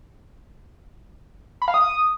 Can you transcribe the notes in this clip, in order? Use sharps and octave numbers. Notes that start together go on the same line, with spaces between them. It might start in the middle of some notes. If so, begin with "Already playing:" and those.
B5
F5
D#6